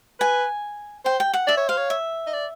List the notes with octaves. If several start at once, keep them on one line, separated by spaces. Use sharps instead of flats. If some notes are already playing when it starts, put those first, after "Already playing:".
B4 G#5
C5 G5
G5
F#5
D5 E5
C#5
C5 F5
C#5
E5
D#5
D5